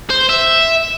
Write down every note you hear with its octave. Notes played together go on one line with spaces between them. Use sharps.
C5
E5